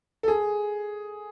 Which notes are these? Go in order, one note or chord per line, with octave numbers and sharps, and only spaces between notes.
A4
G#4